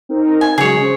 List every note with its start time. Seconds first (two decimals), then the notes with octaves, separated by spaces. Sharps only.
0.09 C4 D#4 A#4
0.41 G#5
0.58 C#3 F#3 G#3 G#4 C#5
0.80 C#4 C5